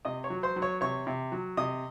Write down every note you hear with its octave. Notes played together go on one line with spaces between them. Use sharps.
C3 D#5 D#6
C#5 C#6
F#3
C5 C6
F#3
C#5 C#6
C3 C#5 C#6
C3
F#3
C3 D#5 D#6